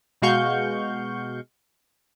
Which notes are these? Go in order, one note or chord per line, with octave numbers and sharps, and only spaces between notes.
B2 G#3 F#4 F5 C#6 G6